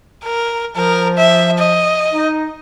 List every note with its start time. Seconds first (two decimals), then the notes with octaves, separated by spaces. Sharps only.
0.24 A#4
0.75 F3 A#4
1.17 E5
1.58 D#5
2.12 D#4